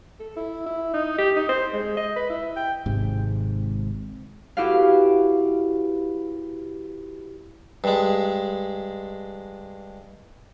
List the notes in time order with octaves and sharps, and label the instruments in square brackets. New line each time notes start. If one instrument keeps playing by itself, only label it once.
[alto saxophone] A4
E4
E4
D#4
G4
D#4
C5
G#3
D#5
B4
E4
G5
[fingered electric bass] G#1 G#2 C3
[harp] E4 F#4 G4 B4 F5
[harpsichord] G2 G#3